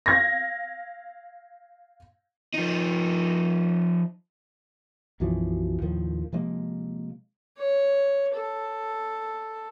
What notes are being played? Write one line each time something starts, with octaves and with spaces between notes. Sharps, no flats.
F5 G#6 A#6
F3 D#4
B1 F#2 E3 F3
D#2 A2 D#3 F3
C3 F3 G#3 A#3
C#5
A4